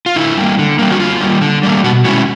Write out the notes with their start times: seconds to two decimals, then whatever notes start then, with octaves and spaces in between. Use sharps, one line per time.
0.06 F4
0.16 D3 E4
0.37 G3 A#3
0.59 D3
0.79 G3 A#3
0.91 F#4
1.00 D3 F4
1.21 G3 A#3
1.41 D3
1.63 G3 A#3
1.84 B2 F#4
2.05 G#3 C#4 E4 F#4